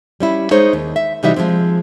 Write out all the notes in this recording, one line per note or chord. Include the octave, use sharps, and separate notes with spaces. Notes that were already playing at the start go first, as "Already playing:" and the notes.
G3 C#4 E4
G#3 D#4 G#4 C5 C#5
D#2
E5
C3 E3 G3 D#4 F#4 E5
F3 F#3 G#3 C4